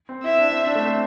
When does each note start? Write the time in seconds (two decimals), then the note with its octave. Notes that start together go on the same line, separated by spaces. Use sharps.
0.09 C4
0.24 E4 E5
0.38 D4
0.51 C4
0.65 D4
0.75 A3
0.84 C4